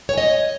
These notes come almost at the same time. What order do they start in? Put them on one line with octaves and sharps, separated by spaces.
C#5 G#5 D#5